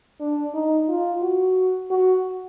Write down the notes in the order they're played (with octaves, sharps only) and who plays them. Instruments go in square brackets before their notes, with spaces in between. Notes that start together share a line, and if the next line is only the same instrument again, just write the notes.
[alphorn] D4
D#4
F4
F#4
F#4